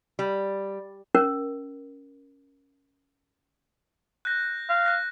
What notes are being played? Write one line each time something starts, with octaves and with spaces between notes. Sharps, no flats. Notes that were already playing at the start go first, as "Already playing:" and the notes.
G3
C#4 A#4
F#6 G6 A#6
F5
F#6 A#6